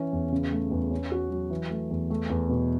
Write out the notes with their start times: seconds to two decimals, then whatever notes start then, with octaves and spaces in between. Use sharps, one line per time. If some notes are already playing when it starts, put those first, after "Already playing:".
Already playing: E3 C#4
0.13 E2
0.32 C#3
0.52 A3
0.71 E2
0.91 C#4
1.12 F#4
1.31 F#3
1.50 E3
1.71 A3
1.91 E2
2.10 A3
2.30 E2
2.49 B2